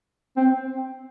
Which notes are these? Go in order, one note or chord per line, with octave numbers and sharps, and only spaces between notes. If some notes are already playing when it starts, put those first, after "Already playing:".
C4